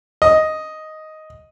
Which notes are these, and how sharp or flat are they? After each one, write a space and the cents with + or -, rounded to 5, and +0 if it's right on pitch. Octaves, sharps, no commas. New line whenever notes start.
D#5 +5